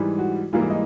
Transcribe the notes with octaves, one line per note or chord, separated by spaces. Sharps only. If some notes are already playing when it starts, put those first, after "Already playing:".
Already playing: G#2 E3 G3
F#4
G#2 E3 G3 A#3 F4
E4
D#4